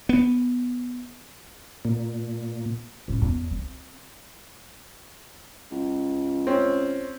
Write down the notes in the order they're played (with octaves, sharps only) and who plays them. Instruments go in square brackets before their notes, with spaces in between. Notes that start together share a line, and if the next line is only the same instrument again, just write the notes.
[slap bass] B3
[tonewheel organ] A#2
[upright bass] A2 C#4
E2
C4
[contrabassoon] C#2
[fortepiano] C4 C#4